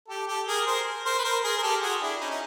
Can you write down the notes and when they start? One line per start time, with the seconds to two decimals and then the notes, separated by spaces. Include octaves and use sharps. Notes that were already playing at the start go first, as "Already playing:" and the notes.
0.09 G4 A4
0.28 G4 A4
0.48 G#4 A#4
0.67 A#4 C5
1.05 A#4 C5
1.19 B4
1.24 A#4 C5
1.44 G#4 A#4
1.58 A#4
1.63 G4 A4
1.82 F#4 G#4
2.02 D4 E4
2.21 C#4 D#4
2.31 D#4